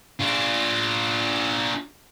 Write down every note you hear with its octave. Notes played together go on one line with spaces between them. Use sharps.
D4 F4